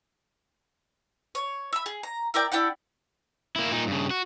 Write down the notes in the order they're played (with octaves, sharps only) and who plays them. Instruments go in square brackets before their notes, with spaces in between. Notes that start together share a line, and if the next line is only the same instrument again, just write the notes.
[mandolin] C#5
E5 B5
G#4
A#5
E4 A#4 D5 G5
D4 E4 G4 F#5
[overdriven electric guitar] A#3 E4
A#2 D#4
G2 C#3
F#4